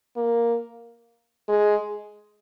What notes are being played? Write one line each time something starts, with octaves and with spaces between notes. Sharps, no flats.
A#3
G#3